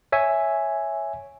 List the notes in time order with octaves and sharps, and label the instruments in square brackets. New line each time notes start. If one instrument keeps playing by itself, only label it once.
[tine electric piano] C#5 E5 G#5